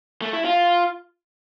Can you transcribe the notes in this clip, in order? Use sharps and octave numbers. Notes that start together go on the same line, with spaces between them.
A3
E4
F4